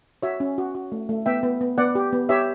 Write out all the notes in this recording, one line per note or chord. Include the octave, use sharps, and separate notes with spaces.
F#4 C#5 E5
C#4
F#4
F#4
A3
A3
B3 E5 G5
B3
B3
B3 D5 F#5
G4
B3
G4 C#5 E5